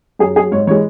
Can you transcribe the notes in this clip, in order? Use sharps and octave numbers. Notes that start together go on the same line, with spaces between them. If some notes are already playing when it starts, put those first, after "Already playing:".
F#2 G#4
F#3 G#4
G#2 C#5
E3 G#3 C#5